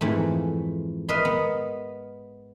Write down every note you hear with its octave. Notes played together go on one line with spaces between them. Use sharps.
F2 G#2 E3 A3
A#4 B4 D#5 E5 A#5 C6
B3